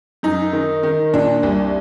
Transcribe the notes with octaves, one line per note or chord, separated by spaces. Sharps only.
F#2 D#4
D#3
D#3
A#2 D4
C2